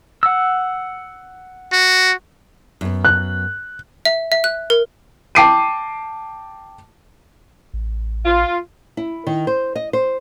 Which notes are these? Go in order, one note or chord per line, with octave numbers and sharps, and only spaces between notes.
F#5 E6
F#4
F#2 B3
F#6
E5
E5
F#6
A#4
G5 A5 D6 C7 D7 D#7
A1
F4
E4
D#3
C5
D#5
C5